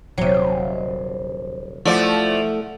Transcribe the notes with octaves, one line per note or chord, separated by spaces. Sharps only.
D#1 C3 F#3 C5
F3 A3 E4 A4 D5 F#5